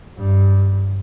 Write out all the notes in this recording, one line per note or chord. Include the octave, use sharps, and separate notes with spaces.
G2